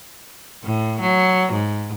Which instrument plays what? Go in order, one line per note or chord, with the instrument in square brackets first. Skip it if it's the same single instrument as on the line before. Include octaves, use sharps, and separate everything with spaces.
[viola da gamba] A2
F#3
G#2